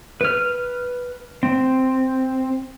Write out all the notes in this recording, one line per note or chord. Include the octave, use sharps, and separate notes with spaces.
B4 F6
C4